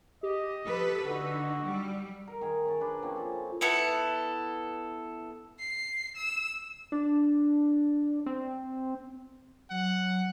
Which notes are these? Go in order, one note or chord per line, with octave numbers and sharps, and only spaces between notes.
G4 D#5
F3 A4 B4
D3 D#4 F#4 E6
G3
A#4
D#3 G#4 A#4
C#4 A5
D4 B4 A5
F3 A#3 C4 C#4
A4 A5
B3 E4 A4
C7
E6
D4
C4
F#3 F#5